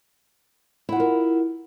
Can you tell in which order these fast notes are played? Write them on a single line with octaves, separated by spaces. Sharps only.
E4 F#5 F4 A#4